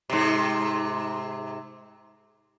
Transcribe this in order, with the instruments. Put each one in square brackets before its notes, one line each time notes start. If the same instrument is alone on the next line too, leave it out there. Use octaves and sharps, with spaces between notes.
[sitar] G#2 C3